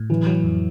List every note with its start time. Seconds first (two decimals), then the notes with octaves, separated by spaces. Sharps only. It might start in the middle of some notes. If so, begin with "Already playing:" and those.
Already playing: A2
0.10 E3 F#3
0.27 F#3
0.44 F2